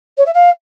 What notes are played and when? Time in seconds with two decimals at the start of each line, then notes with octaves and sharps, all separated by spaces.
0.17 C#5
0.25 E5
0.34 F5